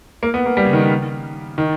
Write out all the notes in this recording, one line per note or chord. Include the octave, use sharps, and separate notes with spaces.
A#3
B3
A#3
G3
C#3
D#3
D#3